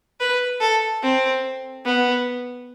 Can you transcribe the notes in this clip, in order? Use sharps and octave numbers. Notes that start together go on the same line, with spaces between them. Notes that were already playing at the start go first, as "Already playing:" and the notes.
B4
A4
C4
B3